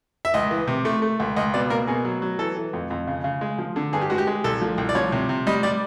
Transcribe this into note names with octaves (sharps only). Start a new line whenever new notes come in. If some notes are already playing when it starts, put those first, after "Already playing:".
E5
C#2 D#5
E3
C3
A3
A3
C#2
C#2 D#5
B2 D5
A#3 A#4
B2 G#4
F#3
F#3
E3 A4
E3
F2
F2
C#3
C#3
G#3
F3
D3
G2 G#4
G4
G#3 F#4
G4
G#3
C2 A4
F3
C2
D5
F3 C#5
C3
C3
G3 D#5
G3 D5